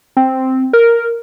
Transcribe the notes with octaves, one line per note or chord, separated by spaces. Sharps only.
C4
A#4